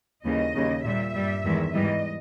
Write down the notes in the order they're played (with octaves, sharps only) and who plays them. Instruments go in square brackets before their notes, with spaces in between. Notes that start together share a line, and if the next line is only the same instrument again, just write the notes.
[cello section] D#2 C#3 E3 G3 D#5
D#2 C#3 G3
A#2 G3 E5
G2 G3
E2 D#3 G#3
G#2 E3 G3 D#5